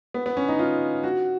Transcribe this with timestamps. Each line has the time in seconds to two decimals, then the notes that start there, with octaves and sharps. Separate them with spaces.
0.14 B3
0.26 B3
0.37 C#4
0.48 D#4
0.59 F4
1.03 F#4